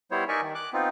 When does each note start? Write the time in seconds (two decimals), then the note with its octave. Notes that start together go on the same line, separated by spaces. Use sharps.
0.11 G3 B3 E4 C5 C#5
0.28 D#4 A#4 D5 E5 G#5 C#6
0.42 D#3
0.55 D6 F#6
0.73 B3 C4 D#4 F4